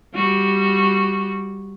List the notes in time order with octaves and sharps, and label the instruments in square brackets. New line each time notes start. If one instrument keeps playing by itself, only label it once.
[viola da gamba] G3 F#4